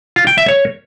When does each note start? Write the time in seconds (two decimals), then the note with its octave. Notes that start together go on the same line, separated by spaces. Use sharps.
0.16 F4
0.27 G5
0.38 E5
0.48 C#5